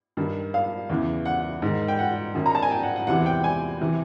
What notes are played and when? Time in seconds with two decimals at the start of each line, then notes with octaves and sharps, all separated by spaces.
0.17 G2 D#3
0.54 F5
0.90 E2 C#3 E3
1.25 F#5
1.62 G#2 D#3
1.88 G5
1.99 F#5
2.34 F#2 D#3
2.46 A#5
2.55 A5
2.62 G#5
2.71 G5
2.83 F#5
2.96 F#5
3.07 E2 C3 E3 F#5
3.26 G5
3.44 G#5
3.81 C3 E3